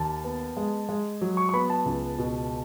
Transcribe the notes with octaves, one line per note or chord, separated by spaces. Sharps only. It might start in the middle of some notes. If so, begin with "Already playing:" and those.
Already playing: D#2 A5
B3
G#3
G#3
F#3
C#6
C#6
B3 B5
A5
C#2
B2